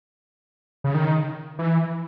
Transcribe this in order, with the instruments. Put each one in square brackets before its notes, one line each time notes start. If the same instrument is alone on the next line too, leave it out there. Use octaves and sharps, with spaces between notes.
[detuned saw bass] C#3
D#3
E3